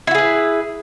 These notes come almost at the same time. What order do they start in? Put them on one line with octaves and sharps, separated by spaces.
E4 F#4 G#4 B4